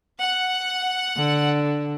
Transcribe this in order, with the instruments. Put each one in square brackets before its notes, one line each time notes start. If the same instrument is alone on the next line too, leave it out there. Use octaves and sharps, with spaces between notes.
[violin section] F#5
[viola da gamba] D3